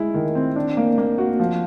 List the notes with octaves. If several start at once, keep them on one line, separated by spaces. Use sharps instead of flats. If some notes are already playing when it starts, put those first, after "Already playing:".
Already playing: G#3 E4
D#3
C4
D4
A#3
A#3
F#4
F3